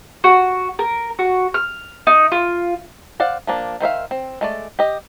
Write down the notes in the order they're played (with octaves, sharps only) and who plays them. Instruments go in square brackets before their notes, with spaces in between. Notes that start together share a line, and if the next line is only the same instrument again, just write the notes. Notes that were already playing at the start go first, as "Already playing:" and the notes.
[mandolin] F#4
A#4
F#4
F6
D#4
F4
[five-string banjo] C5 D5 F5 F#5
F3 A#3 D4
D#3 C5 E5 F5
C4
G#3 A3 D5
G4 D#5